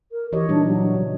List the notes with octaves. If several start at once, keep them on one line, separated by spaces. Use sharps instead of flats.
A#4
E3 G4 C#5 D#5
A#2 G3 D4 D#4
F#3
C#3